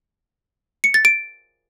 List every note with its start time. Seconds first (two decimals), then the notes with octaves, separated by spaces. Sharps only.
0.84 C#7
0.94 A6
1.05 D7